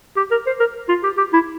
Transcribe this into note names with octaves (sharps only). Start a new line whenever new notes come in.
G4
A#4
C5
A#4
F4
G4
G4
E4